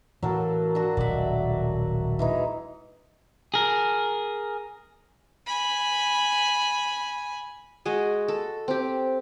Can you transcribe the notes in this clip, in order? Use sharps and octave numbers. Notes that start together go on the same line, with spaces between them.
A2 E3 F#3 A#3 A4
D4 F#4
D#1 B1 D5 E5
E3 G#3 D#4
G#4 A#4
G#5 B5
G#3 F#4 G#4 D#5
A4
C4 G4